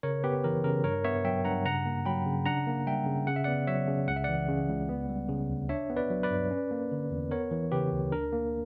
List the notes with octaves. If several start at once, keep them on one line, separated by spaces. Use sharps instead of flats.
C#3 A#4 C#5
B3 G4 B4
E3 A#4
C#3 A#4
G2 A#4 C#5
B3 C#5 E5
F#3 E5 G5
G2 F#5 A#5
C#3 F#5 A#5
A#3
F#3 G5 B5
C#3
D4 F#5 A#5
A#3
G3 E5 G5
C#3
C#3 F#5
E5
B3 D5 F#5
F#3 C#5 E5
C#3
C#2 F#5
E5
E3 D5 F#5
C#3
C#2
B3
G3
C#3
D2
D4 C#5 E5
B3
B4 D5
F#3
B4 D5
G2
C#4
A#3
D3
E2
B3 A#4 C#5
E3
C#3 G4 B4
D2
D4 A#4
A#3